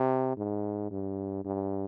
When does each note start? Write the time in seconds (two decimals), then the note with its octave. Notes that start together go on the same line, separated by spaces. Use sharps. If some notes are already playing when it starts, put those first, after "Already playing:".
Already playing: C3
0.37 G#2
0.91 G2
1.45 G2